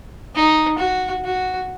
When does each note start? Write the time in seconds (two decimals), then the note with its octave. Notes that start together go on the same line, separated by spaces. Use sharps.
0.35 D#4
0.79 F#4
1.24 F#4